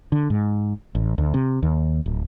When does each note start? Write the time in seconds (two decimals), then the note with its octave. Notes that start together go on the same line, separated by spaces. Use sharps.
0.12 D3
0.30 G#2
0.95 A1
1.18 D2
1.34 C3
1.63 D#2
2.06 D1